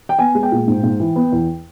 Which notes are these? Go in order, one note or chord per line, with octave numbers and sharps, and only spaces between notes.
G5
B3 G#5
G#3
G5
A#2
G#2
G#2
E3
B3
E2